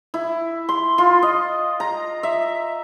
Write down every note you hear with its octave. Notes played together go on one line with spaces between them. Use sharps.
E4
C6
F4
D#5
A#5
E5